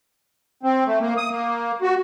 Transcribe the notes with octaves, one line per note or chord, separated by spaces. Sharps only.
C4
A3
A#3
D#6
A#3
F#4